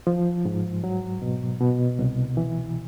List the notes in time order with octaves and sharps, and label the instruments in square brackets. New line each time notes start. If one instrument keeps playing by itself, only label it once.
[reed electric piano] F3
G#2
F#3
B2
B2
C2
E3